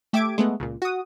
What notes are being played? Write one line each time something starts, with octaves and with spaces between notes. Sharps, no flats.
A3 G4 E5 D6 G#6 D7
G#3 A3 B3
C#2 A#2
F#4 D#6